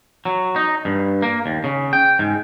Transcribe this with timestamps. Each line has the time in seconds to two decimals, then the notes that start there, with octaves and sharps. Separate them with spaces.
0.25 F#3
0.56 D#4
0.85 G2
1.22 A#3
1.46 D#2
1.64 C#3
1.93 G5
2.19 G#2